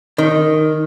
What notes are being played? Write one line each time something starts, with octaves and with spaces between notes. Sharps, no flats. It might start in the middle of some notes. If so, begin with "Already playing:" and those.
D#3